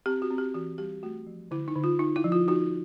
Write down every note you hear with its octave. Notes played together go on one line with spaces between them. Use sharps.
C4 G4
F#4
C4
G4
E3 F#4
G3 G4
A3 F#4
F3
D3 E4
D#4
D3
F4
D#4
E4
F3
F4
D#4 F#4